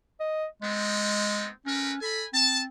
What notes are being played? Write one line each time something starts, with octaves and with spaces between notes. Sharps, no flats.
D#5
G#3 B3 C4 D#4
A3 C#4 A#4 B4
A4 G#5 B5
C4 A5